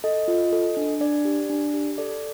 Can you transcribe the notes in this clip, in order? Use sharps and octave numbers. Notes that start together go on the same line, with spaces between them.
A4 D#5
F4
A4
D4
D4 D5
G4
D4
G4
A4 D5